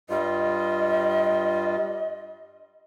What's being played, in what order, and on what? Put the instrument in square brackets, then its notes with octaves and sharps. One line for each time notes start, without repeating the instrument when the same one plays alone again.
[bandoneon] G2 G3 F4 [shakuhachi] D#5